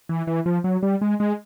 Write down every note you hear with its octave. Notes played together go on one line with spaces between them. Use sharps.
E3
E3
F3
F#3
G3
G#3
G#3